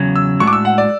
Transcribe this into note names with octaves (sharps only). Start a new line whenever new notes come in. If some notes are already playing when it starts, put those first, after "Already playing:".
Already playing: E2 C#3 F#3
E6
A2 G#3 D4 F#4 C#6
D6
E6
F#5
D5